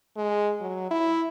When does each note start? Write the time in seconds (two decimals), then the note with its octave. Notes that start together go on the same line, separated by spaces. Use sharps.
0.17 G#3
0.61 F#3
0.91 E4